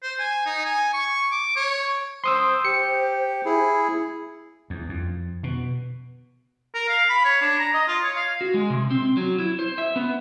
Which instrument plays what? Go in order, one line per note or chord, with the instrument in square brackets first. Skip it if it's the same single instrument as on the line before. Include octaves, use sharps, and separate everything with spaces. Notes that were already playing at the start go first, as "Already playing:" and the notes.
[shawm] C5
G#5
D#4
G#5
C#6
D6
C#5
[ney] C5 [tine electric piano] C6 D#6 E6
[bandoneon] G4 [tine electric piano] C#7
[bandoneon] E4 G#4
[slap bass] E2
F2
B2
[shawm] A#4
F5
B5
C#5
D4
A#5
D#5
F4
C#5
F5
[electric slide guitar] F#4
G#3
C3
C4
F#3
E4
C5
E5
B3